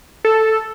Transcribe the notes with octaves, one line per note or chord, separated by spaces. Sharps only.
A4